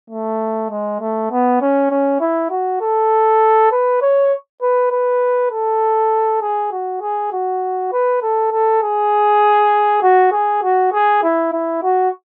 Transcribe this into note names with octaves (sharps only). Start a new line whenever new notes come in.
A3
G#3
A3
B3
C#4
C#4
E4
F#4
A4
B4
C#5
B4
B4
A4
G#4
F#4
G#4
F#4
B4
A4
A4
G#4
F#4
G#4
F#4
G#4
E4
E4
F#4